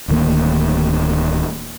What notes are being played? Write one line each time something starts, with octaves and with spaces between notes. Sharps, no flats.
D1 D2 D#3 A#3